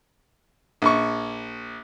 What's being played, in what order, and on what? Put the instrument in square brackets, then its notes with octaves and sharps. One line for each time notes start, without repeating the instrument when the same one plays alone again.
[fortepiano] A#1 C#6